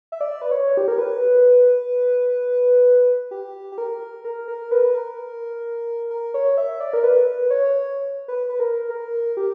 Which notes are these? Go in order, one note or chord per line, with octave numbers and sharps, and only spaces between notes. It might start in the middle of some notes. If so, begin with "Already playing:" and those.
E5
D5
B4
C#5
G4
A#4
B4
G4
G4
A#4
A#4
A#4
B4
B4
A#4
A#4
C#5
E5
D5
A#4
B4
C#5
B4
B4
A#4
A#4
G4